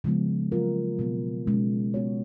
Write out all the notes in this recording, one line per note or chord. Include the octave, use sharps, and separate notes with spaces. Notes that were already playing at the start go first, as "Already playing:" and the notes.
C#3 F3 G#3 B3
F#3 A#3 F4 A#4
B2 F#3 B3
B2 G#3 C#4
B3 F#4 C#5